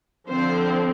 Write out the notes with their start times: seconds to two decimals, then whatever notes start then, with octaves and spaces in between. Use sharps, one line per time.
0.29 D3 F3 C4 C5